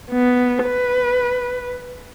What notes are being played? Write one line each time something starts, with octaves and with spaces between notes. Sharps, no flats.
B3
B4